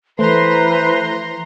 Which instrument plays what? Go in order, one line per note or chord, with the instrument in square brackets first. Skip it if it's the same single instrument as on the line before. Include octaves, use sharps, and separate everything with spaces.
[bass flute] E3 [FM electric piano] A3 [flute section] B4 C5 [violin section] A#5 C6